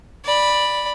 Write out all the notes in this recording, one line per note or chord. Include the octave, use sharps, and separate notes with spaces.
D5 B5